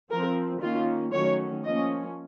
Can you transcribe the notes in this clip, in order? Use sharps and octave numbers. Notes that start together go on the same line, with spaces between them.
F3 C4 A#4
D#3 A#3 C#4 F4
D#3 F#3 A3 C#4 C#5
F3 A#3 C#4 D#5